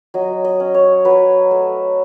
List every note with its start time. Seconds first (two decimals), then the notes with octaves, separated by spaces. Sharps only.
0.14 F#3 D#5
0.44 D#5
0.60 C#4
0.74 C#5
1.05 F#3 B4
1.51 A3